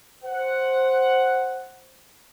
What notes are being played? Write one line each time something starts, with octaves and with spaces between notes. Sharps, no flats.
C5 F#5